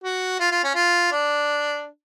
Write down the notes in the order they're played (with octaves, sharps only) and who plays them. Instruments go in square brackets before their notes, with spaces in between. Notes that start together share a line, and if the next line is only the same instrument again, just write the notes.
[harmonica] F#4
F4
F4
C#4
F4
D4